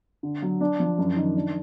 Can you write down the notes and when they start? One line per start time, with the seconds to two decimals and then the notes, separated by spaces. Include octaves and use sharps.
0.23 D3
0.42 F#3
0.61 D4
0.80 F3
0.99 F#2
1.17 D#3
1.36 D4